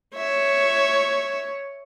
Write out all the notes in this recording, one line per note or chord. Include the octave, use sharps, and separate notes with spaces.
C#5 E5